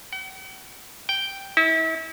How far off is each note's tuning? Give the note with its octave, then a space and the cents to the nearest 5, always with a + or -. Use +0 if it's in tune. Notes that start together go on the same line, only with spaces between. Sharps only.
F#5 +45
G5 -5
E4 -35